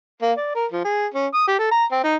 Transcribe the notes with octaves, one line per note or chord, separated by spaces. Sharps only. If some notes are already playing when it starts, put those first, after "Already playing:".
A#3
D5
A#4
F3
G#4
C#4
D#6
G4
A4
A#5
C4
D#4